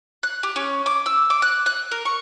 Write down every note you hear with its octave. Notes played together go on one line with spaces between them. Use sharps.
F#6
G4
C#4
D6
E6
D6
F#6
F#6
A#4
C#6